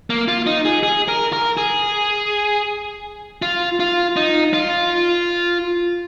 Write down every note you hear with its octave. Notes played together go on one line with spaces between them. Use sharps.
A#3
F4
D#4
G#4
G#4
A#4
A#4
G#4
F4
F4
D#4
F4